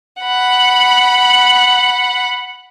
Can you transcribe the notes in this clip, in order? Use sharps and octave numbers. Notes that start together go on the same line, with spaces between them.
F#5 B5